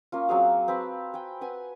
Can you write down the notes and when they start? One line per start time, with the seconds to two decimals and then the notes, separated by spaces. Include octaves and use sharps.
0.12 A#3 C#4 F4
0.28 F#3 C4 G#4 F5
0.68 C4 B4 A5 B5
1.14 G5 G#5
1.41 B4 F#5 G#5